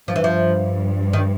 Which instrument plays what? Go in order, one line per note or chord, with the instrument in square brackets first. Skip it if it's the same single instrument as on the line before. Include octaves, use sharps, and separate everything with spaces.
[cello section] G2 [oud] F3
[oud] E3
F3
D#3